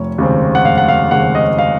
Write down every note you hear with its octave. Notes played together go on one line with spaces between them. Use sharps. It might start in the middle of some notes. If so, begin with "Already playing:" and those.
Already playing: F1 C#5
D#2 C#3 G#3 C4
F#5
F1 F5
F#5
F5
D#2 C#3 G#3 C4 F#5
D#5
F5